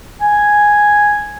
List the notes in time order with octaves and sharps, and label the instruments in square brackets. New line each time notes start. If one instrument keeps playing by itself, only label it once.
[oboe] G#5